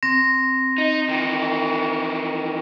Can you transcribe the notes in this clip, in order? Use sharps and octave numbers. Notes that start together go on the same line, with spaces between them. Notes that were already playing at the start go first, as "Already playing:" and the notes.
C4 A#6
D#4
D#3 E3